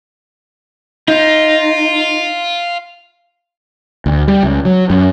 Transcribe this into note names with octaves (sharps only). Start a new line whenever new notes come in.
D#4 F4
D2
G3
C#2
F#3
F#2